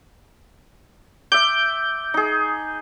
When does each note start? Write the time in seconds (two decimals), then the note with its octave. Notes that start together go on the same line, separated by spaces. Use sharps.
1.32 E5 D6 G6
2.14 D#4 G#4